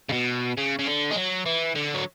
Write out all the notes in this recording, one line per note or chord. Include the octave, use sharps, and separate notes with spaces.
C#3
B2
C#3
C#3
D3
G#3
F#3
E3
D3
F#3